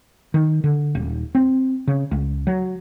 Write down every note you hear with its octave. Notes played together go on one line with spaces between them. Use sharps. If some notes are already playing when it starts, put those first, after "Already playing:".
D#3
D3
D#1
C4
C#3
C#2
F#3